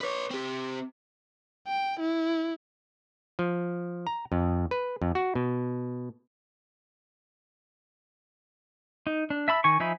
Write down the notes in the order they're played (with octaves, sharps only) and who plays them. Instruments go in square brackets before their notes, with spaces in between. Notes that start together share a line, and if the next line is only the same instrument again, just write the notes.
[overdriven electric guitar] B4 C#5
C4 G4
[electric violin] G5
E4
[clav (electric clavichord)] F3
A#5
F2
B4
F2
F#4
B2
[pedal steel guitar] D#4
D4
E5 A5 B5 E6
D#3 G#5 C#6
F3 D#4 E5 G#5 B5